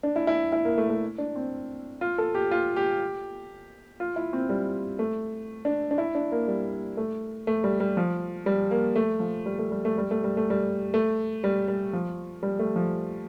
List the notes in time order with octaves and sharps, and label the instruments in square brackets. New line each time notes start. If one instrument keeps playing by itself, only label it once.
[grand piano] D4
E4
E4
E4
A#3
A3
A3
D4
C4
F4
A4
G4
F4
G4
F4
E4
C4
G3
A3
D4
D4
E4
D4
A#3
G3
A3
A3
G3
G3
F3
G3
A#3
A3
F3
G3
A3
G3
A3
G3
A3
G3
A3
G3
A3
G3
G3
F3
G3
A3
F3